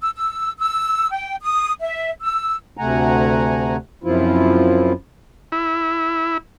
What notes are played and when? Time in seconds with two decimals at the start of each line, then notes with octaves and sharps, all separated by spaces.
0.01 E6
0.15 E6
0.59 E6
1.11 G5
1.41 D#6
1.80 E5
2.21 E6
2.77 D2 C3 A3 F#5 G#5 A#5
4.04 F#2 C3 F3 E4 F4
5.52 E4